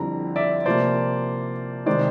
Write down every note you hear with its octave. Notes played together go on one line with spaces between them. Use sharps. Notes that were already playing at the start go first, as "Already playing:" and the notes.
Already playing: F2 D3 G3 C4 E4 A#5
D5 E5
C3 F3 A#3 C5 D5
C3 D#3 G#3 C5 D5